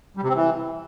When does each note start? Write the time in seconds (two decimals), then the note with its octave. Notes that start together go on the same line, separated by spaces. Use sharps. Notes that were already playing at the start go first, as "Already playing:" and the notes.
0.17 G3
0.23 C3
0.29 C4
0.35 E3